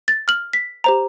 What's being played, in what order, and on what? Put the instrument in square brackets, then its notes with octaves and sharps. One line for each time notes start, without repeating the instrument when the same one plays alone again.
[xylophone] A6
F6 F#7
B6
G4 C5 A#5